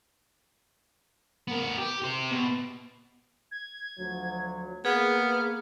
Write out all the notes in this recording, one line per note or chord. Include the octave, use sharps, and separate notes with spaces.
B3 A#4
G4
G4 C5
B2
G#6
D2 F3 F#3
A#3 B3 G#4 F6